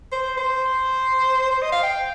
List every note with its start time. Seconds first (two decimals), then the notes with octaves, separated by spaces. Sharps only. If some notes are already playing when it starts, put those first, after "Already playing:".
0.12 C5
0.37 C5
1.51 C5
1.62 D#5
1.72 F5
1.83 G5